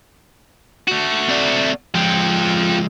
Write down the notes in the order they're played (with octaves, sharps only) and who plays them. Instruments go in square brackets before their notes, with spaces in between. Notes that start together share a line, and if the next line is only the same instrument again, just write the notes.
[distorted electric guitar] A3 F#4
[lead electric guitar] C4 D5
[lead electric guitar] F3 G#3 [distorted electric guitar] F4 G5